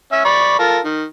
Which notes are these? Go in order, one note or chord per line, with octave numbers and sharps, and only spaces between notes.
C#4 E5
D5 B5 C#6
F4 A4 A#4
D#3